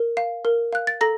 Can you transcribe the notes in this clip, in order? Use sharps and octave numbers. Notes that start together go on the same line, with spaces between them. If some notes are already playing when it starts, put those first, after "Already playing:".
Already playing: A#4
F5
A#4
F5 F#6
A6
A4 A#5 A#6